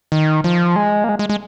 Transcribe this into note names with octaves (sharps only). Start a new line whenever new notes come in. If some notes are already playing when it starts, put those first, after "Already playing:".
D#3
F3
G#3
A#3
G#3
G#3
G#3